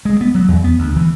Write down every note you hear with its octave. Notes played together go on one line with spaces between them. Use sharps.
G#3
B3
F#3
E2
B3
D2
E3